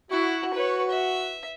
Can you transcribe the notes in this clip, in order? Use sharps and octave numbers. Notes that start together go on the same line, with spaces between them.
E4 F#4
B4 C#5
E5